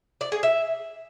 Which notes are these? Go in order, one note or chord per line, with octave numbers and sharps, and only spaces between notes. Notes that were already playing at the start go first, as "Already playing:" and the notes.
D5
G#4
E5